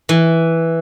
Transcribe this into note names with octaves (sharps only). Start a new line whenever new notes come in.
E3